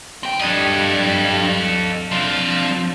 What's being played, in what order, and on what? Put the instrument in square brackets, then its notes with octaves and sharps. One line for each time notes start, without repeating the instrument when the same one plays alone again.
[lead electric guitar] C4 G5
[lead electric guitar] G3 D4 [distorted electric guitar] A4 D#5
[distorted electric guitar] F3 [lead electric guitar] C4 D4